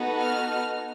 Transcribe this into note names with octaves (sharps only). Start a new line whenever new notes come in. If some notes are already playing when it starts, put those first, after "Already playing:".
Already playing: B3 D#4 F#4 A4
F6